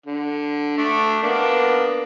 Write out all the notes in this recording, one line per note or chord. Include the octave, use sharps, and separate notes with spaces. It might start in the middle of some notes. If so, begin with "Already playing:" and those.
D3
A3 D4
A#3 B3 D4